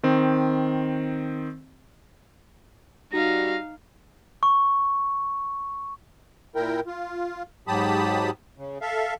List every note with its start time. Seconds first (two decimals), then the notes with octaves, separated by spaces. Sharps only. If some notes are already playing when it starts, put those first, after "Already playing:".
0.03 D#3 C4
3.12 G3 D#4 F#4 F5 A#6
4.43 C#6
6.55 A#2 E4 A#4 G5
6.87 F4
7.67 G#2 F#3 G4 A5 B5 D#6
8.58 C#3
8.81 A4 E5 F5